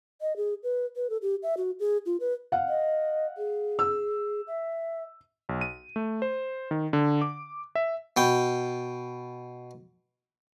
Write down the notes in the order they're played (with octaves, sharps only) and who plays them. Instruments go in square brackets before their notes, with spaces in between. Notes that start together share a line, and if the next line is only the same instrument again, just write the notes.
[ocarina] D#5
G#4
B4
B4
A4
G4
E5
F#4
G#4
F4
B4
[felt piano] F5 F#5
[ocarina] D#5
G#4
[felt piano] E6
[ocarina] E5
[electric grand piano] B1
D#7
A3
C5
D#3
D3
D6
E5
[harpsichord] B2 G5